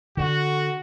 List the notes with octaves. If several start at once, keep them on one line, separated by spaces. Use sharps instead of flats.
D3 F#4